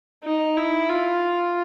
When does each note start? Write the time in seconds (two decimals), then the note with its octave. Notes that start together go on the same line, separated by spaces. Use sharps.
0.24 D#4
0.57 E4
0.90 F4